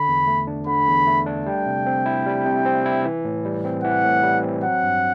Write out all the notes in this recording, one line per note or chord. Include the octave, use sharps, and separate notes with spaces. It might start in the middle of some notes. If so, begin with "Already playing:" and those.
Already playing: D3 B5
E2
A3
D4
D3 B5
E2
A3
D4
G3 G5
C3
C4
E4
G3
C3
C4
E4
E3
A2
G3
C4
E3 F#5
A2
G3
C4
F#3 F#5
G2